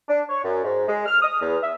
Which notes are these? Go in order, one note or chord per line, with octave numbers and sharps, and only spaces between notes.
D4
C#5
F#2
G#2
G#3
F6
D#6
E2
E5